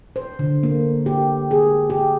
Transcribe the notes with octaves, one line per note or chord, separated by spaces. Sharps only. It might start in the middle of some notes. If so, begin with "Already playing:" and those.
C5
D3
A#3
G4
G#4
G4